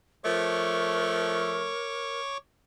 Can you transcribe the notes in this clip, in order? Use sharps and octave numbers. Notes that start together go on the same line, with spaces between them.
F3 A3 A#4 C#5 C#6 D6